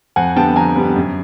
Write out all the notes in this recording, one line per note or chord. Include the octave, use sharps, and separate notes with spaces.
F2 F#5 G#5
D3 G3 B3 G5 A5
F2 G#5 A#5
D3 G3 B3
F#2